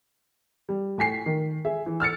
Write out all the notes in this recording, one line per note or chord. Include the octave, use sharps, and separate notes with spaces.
G3
A2 G#5 B6 C7
D#3
G#4 E5
E3
E6 F6 A6 C#7